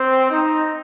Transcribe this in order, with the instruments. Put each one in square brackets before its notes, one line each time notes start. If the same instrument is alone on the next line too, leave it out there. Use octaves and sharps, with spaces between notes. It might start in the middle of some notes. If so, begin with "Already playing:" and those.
Already playing: [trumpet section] C4
D#4